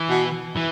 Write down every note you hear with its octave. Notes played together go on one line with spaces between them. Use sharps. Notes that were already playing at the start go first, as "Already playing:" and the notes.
Already playing: E3
B2
E3